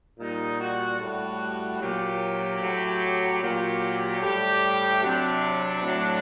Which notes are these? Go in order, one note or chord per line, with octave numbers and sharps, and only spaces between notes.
A#2 G3 D#4
F#4
A2 G3 F#4
A#2 F#3 G4
A2 F#3
A#2 F#3
A2 G3 G4
C3 F#3 D4
A2 F#3